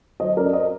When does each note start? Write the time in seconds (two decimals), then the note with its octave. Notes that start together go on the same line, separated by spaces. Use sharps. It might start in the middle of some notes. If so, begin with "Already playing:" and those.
0.20 F#3 C5 D#5
0.37 F#2 A#4 D5
0.53 C5 D#5